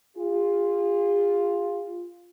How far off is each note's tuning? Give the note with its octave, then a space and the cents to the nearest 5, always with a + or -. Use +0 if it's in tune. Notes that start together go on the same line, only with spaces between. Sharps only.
F4 +5 G#4 -40